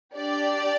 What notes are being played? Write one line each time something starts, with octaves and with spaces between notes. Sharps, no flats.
D4 G4 D5